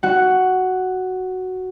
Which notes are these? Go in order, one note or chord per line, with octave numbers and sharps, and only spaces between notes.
F#4 F#5